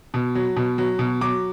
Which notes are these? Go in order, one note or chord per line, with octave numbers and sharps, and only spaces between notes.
B2
F#3
B2
F#3
B2
F#3 D6